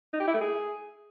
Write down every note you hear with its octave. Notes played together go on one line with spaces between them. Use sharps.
D#4
G4
E4
A3
G#4